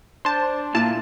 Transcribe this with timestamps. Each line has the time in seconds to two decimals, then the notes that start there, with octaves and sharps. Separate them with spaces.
0.25 D4 C5 A5
0.75 A#2 A#3 E4 F4 A5